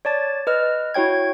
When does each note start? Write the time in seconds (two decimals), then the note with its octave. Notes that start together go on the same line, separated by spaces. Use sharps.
0.05 C#5 D5 A5 A6
0.47 B4 D#5 F6
0.94 E4 F#4 C#5 G5 G#6